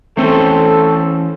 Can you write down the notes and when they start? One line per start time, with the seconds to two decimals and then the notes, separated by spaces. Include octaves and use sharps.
0.17 E3 A3 C4 C#4 A4 C5